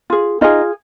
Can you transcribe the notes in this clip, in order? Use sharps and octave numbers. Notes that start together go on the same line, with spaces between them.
F4 G#4
D#4 F4 G#4 D#5